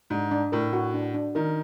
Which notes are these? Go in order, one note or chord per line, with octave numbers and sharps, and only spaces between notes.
G#2 D4
D4
A2 A#4
F#4
D4
D4
D#3 A#4